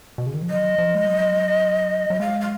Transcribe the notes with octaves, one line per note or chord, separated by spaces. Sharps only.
B2
C#3
D#3
F3
F#3 D#5
F3
G#3
F#3
F#3
G#3 F5
F5